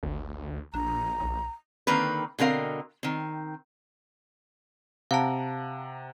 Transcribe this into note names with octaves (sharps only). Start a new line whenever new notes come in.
G#1 D2
A#1 D4 A#5
B1
D3 D#3 A#3 C4 B4
B2 D3 C4 A#4 F5
D#3 C4
C3 F5 F#5 A5 A#5